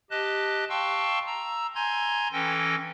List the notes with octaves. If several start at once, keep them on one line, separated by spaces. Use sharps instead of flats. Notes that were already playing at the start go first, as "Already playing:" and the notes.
G4 D#5 A5 F#6
F5 G5 A5 C6 C#6 E6
A#5 E6
G#5 A#5 C6 G6 G#6
E3 C#4 A4 G5 A#6